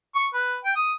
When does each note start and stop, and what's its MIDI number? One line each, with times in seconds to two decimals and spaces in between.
0.15 0.27 85
0.34 0.57 71
0.64 0.75 79
0.76 0.93 87